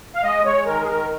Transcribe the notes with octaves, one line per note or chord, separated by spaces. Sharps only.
F5
G#3 D#5
G#3 C#5
D#3 A#4
G#4
D#3 A#4